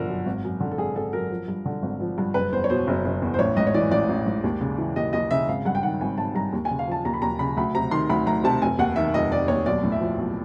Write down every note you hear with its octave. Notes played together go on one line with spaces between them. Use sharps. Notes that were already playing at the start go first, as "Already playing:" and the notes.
Already playing: G1 D3 F3 A#4
F#2
G#1
F#2
D3
A4
G#1 G#4
G#1 A4
F#2 A#4
F3
G2
D3
G#1
F3
G2
F#1 B4
E2 C5
C#5
B2 C5
F#1
F#1
E2
C5
A1 C#5
G#2 D#5
C#5
E3 D5
A1 D5
A1
G#2
D#2
C#3
E3
D#2 D#5
D#2 D#5
C#3 E5
G#1 F5
G2 F#5
G5
D#3 F#5
G#1 G#5
G#1 A5
G2 A#5
D#2
G#5
C#3
F5
F3 A5
D#2 A#5
B5
D#2 A#5
C#3 B5
D2 B5
C3 A#5
D#3 C6
D2 B5
D2 A#5
C3 A5
F1 G#5
D#2 F#5
D#3 E5
F1 D#5
F1 D5
D#2 C#5
B1 D5
A2
E5
F3
B1